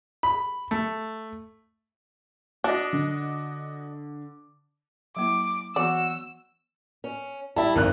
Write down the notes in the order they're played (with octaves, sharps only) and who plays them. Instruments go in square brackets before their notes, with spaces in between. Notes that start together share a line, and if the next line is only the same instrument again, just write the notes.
[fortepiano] B5
A3
[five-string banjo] D4 [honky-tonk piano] F#4 D#5 [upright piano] D6
[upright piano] D3
[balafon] F#3 A#3 E4 [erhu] D6
[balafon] E3 B3 [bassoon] F#4 [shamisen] D5 [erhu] E6
[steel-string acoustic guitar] C#4
[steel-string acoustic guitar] G3 E4 [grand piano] E5 A5
[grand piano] G#1 F2 F#6 [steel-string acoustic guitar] A#4